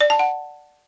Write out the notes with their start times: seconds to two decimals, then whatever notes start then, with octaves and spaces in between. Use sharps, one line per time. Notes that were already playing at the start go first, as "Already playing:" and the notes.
0.01 D5
0.10 A5
0.19 F#5